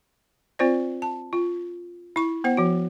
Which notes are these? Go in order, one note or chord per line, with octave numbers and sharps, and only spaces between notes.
C4 F4 C5 D5
A5
F4
E4 C#6
B3 C5 F#5
F3 F#4